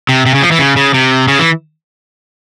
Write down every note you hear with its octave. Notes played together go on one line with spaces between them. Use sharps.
C3
C3
C#3
F3
E3
C#3
C#3
C3
C#3
E3